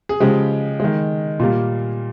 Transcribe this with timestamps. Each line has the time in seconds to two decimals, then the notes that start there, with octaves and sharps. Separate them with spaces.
0.09 G#4
0.20 C#3 F3 G#3 G4
0.80 D#3 G#3
1.40 A#2 G3 A#3 F4